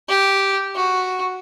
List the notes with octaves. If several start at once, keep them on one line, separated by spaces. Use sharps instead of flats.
G4
F#4